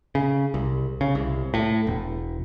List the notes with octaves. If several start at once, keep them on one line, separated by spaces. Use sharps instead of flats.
C#3
C2
C#3
C2
A2
E1